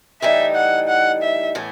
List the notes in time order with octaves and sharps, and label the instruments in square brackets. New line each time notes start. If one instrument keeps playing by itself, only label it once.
[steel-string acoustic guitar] A2 E3 G3 D#4 [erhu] E5
[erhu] F#5
F#5
E5
[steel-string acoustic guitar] A2 E3 B3